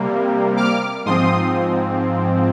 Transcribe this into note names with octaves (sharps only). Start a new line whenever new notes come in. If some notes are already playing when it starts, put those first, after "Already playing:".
Already playing: C3 G3 A#3
D6 F6
G#2 F3 C4 C6 D#6